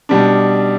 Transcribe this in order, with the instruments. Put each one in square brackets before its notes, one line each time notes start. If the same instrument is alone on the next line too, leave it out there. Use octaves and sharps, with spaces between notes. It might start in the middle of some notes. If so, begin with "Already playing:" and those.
[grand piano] B2 G3 D4